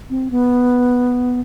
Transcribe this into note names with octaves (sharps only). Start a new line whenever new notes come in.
C4
B3